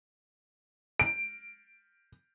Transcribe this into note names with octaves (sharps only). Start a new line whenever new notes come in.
D7